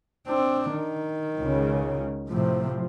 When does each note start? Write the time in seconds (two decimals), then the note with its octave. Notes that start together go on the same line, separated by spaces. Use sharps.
0.27 C4 D4
0.72 D#3
1.40 C#2 C#3
2.29 A2 C3 F3